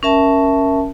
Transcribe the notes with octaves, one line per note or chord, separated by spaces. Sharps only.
C#4 A#4 E5 A5